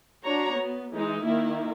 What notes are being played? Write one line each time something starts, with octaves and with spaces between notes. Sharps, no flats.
D4 F#4 C#5 A#5
B3
E3 G#3 D#4
D#3 A#3 E4